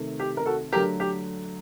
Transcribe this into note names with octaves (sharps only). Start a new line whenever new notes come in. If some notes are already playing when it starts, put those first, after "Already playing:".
Already playing: C3 D#3 A3
G4
A#4
F#4 A4
D3 F#3 A3 G4 A#4
G4